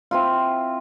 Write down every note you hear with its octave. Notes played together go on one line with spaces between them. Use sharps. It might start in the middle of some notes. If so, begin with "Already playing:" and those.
C4 E4 F4